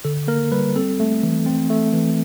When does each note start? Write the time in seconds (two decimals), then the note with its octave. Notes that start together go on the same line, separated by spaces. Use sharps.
0.05 D3 A4
0.28 A#3 A#4
0.52 G3 B4
0.76 C4 A4
1.00 A3
1.23 E3
1.46 C4
1.70 A3
1.93 E3